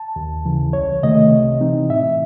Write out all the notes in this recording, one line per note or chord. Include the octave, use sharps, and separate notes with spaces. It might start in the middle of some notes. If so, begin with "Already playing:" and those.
Already playing: A5
D#2
C#3 E3
C2 C#5
C3 D#3 A3 D#5
C3
E3 C4 D#4
A2 E5